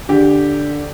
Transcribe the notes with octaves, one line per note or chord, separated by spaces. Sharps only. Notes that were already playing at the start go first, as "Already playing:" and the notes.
D3 G4